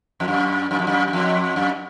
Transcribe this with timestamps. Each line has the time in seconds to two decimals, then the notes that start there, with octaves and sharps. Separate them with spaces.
0.20 F2
0.28 F#2
0.71 F#2
0.79 F2
0.87 F#2
1.08 F#2
1.13 F2
1.56 F#2